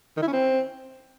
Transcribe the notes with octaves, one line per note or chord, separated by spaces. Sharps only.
D#3
E4
C#4
C4